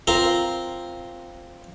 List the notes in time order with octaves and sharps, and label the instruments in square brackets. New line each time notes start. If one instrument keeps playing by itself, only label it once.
[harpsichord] C4 F4 A#4